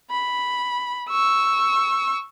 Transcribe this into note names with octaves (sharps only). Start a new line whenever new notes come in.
B5
C#6 E6